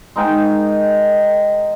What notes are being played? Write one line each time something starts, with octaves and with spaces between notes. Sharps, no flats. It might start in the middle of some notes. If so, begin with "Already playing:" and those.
G#3 D#4 A#4 G5